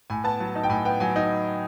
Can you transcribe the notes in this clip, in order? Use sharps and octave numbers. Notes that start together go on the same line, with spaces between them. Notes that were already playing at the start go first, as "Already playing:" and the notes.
A2 G#5
B3 A5
F#3
D#4
G5
A2 G#5
B3 G5
F#3 G#5
D#4